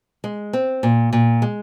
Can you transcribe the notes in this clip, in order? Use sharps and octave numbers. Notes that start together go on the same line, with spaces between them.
G#3
C4
A#2
A#2
G#3